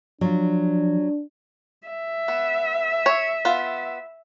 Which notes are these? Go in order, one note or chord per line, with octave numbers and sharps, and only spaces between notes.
F3 F#3 D4 F4
E5
B3
C#5
B3 F4